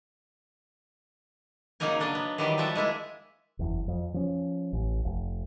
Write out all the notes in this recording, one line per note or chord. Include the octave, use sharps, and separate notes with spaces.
C#3 F#3 A#3 D#4 A#4 G#5
F#3 D4 A#4 D#5
B3
D#3 E3 F#3 G3 G4 B4
F3 G3 F4 F#4 E5 A5
G#3 A#3 E4 G#5
F#1 E2
F2
F3 C#4
A1
F1